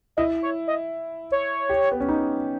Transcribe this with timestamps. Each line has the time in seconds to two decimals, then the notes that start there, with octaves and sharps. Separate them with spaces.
0.17 E4 D#5
0.42 C#5
0.67 D#5
1.32 C#5
1.69 G4
1.92 B3
2.00 C#4
2.09 D#4